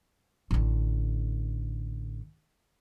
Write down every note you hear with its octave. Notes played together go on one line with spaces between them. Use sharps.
A1 D3